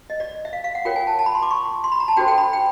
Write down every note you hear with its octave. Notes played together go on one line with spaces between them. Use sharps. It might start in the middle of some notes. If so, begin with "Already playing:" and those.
D#5
D5
E5
F5
F5
F#5
F4 A#4 C#5 G5
G#5
A5
A5
B5
C6
D6
C#6
C6
B5
A#5
A5
D4 F#4 A4 C5 G5
G5
B5
G5